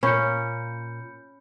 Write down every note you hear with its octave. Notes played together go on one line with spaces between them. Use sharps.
A#2 A#3 C#4 B5 G6 C#7